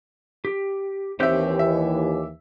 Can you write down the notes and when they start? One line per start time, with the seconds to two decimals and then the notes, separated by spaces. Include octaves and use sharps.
0.45 G4
1.20 D#2 E3 C4 G4 C#5 E5 G6
1.59 E5